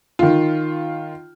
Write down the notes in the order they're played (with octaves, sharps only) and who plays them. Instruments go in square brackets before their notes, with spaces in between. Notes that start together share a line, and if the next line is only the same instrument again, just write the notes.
[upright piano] D#3 F4